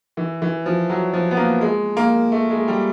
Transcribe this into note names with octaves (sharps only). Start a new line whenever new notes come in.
E3
E3
F3
F#3
F3
B3
A#3
G#3
A#3
A3
G#3
G3